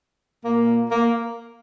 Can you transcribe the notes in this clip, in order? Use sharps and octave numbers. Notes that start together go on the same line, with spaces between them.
A#2 A#3
A#3